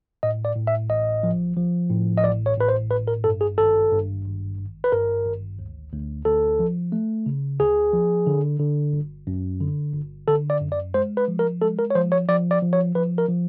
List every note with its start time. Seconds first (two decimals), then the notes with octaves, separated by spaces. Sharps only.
0.23 A2 D#5
0.45 D5
0.56 A2
0.67 E5
0.90 A1 D#5
1.23 F3
1.56 F3
1.90 A2
2.17 D#5
2.23 A1 D5
2.46 C#5
2.57 A2 B4
2.69 C5
2.91 G#1 B4
3.08 A#4
3.24 G2 A4
3.41 G#4
3.58 G#1 A4
3.92 G2
4.25 G#1
4.58 G#1
4.84 B4
4.92 G2 A#4
5.26 G#1
5.59 D2
5.93 D2
6.25 D2 A4
6.59 F3
6.92 A3
7.26 C#3
7.60 D2 G#4
7.93 F3
8.27 D3
8.60 D3
8.93 G1
9.27 F#2
9.61 D3
9.94 G1
10.28 D3 A4
10.50 D5
10.61 F#2
10.72 D5
10.94 G#3 C5
11.17 B4
11.28 F3
11.39 A#4
11.61 G#3 A4
11.79 A#4
11.90 C#5
11.95 F3 C5
12.12 C#5
12.28 F3 D5
12.51 D5
12.62 F3
12.73 C#5
12.95 F3 B4
13.18 A#4
13.28 F3